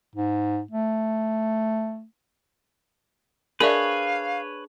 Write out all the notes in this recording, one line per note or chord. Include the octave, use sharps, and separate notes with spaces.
G#2
A3
D4 G#4 A#4 B4 C#5 D5 E5 F5